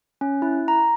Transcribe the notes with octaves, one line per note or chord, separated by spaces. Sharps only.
C#4
E4
A#5